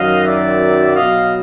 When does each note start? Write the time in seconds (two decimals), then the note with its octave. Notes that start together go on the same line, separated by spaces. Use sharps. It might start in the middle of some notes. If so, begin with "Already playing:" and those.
Already playing: F#2 D#3 F#3 D#5 F5
0.25 D5 E5
0.96 B2 F#3 D#5 F5